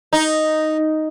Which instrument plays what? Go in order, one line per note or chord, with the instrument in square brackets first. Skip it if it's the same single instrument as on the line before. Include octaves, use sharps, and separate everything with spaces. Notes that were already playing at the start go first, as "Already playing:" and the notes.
[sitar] D#4